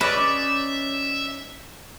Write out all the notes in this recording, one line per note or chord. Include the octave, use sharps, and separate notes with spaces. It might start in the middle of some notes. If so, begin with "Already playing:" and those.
C#4 D#4 B4 D5 E5